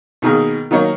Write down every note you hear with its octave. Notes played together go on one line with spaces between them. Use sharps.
B2 D#3 A#3 G#4
D#3 F#3 A#3 C#5 D#5